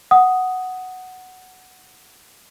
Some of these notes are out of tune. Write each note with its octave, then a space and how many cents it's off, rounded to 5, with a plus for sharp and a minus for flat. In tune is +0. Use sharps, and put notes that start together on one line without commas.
F#5 +0 D#6 +0